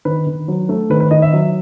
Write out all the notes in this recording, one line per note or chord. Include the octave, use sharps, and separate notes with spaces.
D#3 B4
D#3
F#3
A3
D#3 B4
B4
D#3 D#5
E5
F#3